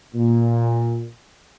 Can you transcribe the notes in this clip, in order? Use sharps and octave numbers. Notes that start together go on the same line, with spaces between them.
A#2